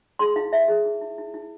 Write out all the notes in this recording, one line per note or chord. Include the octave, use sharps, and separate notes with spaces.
G#4 C6
E4 F5
E4 E5
G#4
E4
E4
E4
E4